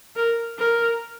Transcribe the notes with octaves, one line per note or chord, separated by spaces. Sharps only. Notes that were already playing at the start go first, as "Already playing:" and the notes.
A#4
A#4